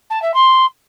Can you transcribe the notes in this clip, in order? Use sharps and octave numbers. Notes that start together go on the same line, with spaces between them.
A5
E5
C6